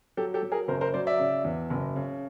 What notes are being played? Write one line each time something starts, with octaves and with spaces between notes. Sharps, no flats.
F#3 G4 A4
G4 A4
F#3
G#4 A#4
F#1 A#4 C5
A#4 C5
F#3 C5 D5
D5 E5
C#3
E2
F#1
C#3